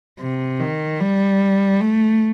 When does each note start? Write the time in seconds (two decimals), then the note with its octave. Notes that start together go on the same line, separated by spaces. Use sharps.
0.20 C3
0.60 D#3
1.00 G3
1.81 A3